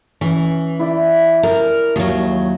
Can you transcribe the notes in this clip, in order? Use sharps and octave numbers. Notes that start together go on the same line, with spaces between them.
E3 C#4
E4 D5
A#4
D#2 F#3